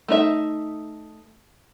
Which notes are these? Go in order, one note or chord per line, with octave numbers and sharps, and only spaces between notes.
A3 D#4 E5